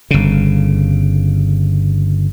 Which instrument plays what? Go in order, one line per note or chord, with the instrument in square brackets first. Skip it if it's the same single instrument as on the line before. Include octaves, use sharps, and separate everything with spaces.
[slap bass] G1 C#3